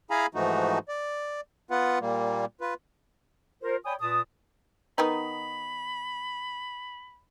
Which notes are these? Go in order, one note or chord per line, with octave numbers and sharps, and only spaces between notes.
E4 G#4 F5 G#5 A#5 B5
G#2 E3 F3 A3 D#4 F#4
D5
B3 F4 B4 F#5
A#2 G3 A#3
F4 B4
F4 A#4 C5
C#5 D5 G5 G#5 B5 D#6
A#2 B4 A5 D#6
D#3 B3 D#4 B5